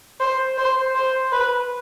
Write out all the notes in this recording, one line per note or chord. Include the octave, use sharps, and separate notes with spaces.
C5
C5
C5
B4